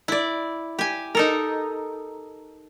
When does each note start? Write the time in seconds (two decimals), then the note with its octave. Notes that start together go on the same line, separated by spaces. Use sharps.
0.08 E4 D5
0.79 G4 G#5
1.15 D#4 A4 A#4